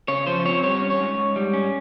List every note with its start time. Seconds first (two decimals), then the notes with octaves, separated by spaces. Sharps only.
0.08 C#3 C#5
0.27 F3 C5
0.45 C4 C#5
0.63 G3 C#5
0.82 C#4
0.90 C#5
1.00 G#2
1.18 G#2
1.36 G3
1.53 C#4